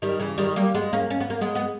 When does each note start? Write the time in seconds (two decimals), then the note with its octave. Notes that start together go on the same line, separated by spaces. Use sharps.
0.02 D#3 G3
0.20 C#3 E3
0.38 D#3 G3
0.56 G3 A#3
0.75 G#3 B3
0.93 A#3 C#4
1.10 C#4
1.20 B3
1.30 A#3
1.41 G#3 B3
1.55 B3